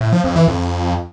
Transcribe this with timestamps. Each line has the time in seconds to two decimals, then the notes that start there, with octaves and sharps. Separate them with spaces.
0.01 A2
0.12 F3
0.24 F2
0.36 E3
0.48 F2